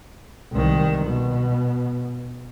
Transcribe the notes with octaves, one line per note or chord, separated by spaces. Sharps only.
C2 D#3
B2